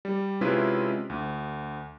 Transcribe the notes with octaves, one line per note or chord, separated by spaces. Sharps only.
G3
C3 G#3 C#4 E4 F4 B4
D2